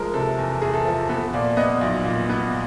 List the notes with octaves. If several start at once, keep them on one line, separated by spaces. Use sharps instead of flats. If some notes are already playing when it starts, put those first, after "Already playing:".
Already playing: F3 G#3 A#4
C3 A4
E2
E2 G#4
A4
F3
B3 A4
A#2 D5
B3 D#5
B1
A#2
B3